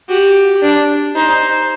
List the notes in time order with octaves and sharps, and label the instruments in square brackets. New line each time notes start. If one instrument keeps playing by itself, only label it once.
[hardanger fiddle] F#4 [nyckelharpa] G4
[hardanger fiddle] D4
[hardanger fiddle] D#4 [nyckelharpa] C5